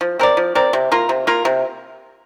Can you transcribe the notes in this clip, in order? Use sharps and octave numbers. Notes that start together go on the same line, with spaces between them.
F3
C4 A#4 D5
F3
C4 A#4 D5
C3
A#3 F4 A#4
C3
A#3 F4 A#4
C3